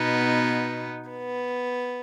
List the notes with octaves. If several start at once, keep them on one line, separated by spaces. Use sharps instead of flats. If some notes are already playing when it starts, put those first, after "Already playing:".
Already playing: B2 B3 D#4
B3